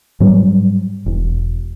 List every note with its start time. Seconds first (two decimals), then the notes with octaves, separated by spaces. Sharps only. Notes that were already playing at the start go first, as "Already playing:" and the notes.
0.20 G#2 F#3 G3
1.06 E1